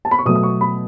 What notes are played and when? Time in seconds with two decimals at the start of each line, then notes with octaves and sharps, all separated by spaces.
0.05 A5
0.11 B5
0.19 C#6
0.25 B2 F#3 A3 D#6
0.35 D#6
0.43 C#6
0.61 B5